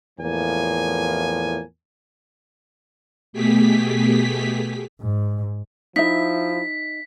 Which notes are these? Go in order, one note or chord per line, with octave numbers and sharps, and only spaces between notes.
E2 A2 F3 A#3 G#5
B2 A3 G4 G#4 B6
G#2
F3 D#4 E4 E5 B6